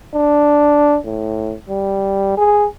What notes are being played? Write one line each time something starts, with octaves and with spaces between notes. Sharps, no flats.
D4
A2
G3
G#4